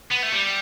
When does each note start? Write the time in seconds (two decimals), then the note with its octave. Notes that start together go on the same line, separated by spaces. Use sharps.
0.11 B3
0.23 A3
0.32 G3